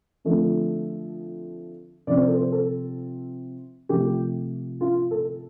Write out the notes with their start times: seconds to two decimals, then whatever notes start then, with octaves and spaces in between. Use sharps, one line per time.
0.25 D3 F3 A3 C4
2.07 C3 F3 C4 D5
2.18 C5
2.27 A4
2.38 C5
2.52 A4
3.89 C3 F3 A3 G4
4.81 F4
5.11 A4